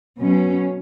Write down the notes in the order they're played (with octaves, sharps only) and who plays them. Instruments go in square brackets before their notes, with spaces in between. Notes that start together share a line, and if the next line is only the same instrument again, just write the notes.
[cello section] B2 F#3 C#4